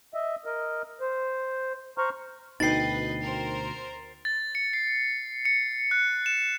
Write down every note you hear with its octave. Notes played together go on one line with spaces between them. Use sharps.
D#5 E5
A#4 D#5
C5
C5 A#5 C#6 F6
D2 B2 D#4 B4 D#5 G5 A6 C7
A#4 C5
A6
C#7
C7
C#7
F#6
E7